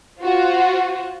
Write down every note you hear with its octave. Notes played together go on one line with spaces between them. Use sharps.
F4 F#4 C5